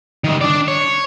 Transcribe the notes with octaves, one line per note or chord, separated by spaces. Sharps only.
D#3 G3
D4 D5
C#5